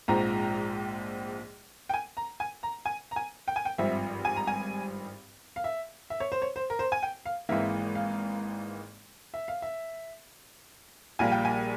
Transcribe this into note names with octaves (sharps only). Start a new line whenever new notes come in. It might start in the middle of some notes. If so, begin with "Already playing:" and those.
A#1 G#2 F3 C4 A#5
G5
G#5
A#5
G#5
A#5
G#5
A#5
G#5
G5
G#5
G5
G#1 G2 F3 C4 E5
G#5
A#5
G#5
F5
E5
E5
C#5
C5
C#5
C5
A#4
C5
G#5
G5
F5
G#1 G#2 E3 A#3 E5
F5
E5
F5
E5
A#1 A#2 G3 A#3 G#5
G5
G#5